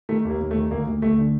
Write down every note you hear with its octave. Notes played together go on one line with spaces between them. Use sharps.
D#3 A3
D#2 A#3
D#2
A3
D#3
D2 A#3
D2
D2 A3
D3